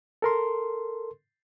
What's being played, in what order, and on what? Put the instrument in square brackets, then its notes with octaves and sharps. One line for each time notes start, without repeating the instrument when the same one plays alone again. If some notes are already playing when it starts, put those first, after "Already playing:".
[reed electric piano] A4 A#4 C6